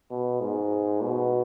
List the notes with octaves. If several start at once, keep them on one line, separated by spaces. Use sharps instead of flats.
B2
G#2
B2